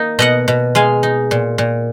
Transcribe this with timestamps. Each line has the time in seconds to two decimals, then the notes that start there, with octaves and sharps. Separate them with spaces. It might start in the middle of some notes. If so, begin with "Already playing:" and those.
Already playing: A#3 D#4
0.19 B2 D#5 F#5
0.48 B2
0.75 G#3 F5 G#5
1.03 D#4
1.31 A#2
1.58 A#2